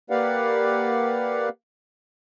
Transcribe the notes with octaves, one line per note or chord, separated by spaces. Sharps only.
A#3 G4 B4 D5 F5 F#5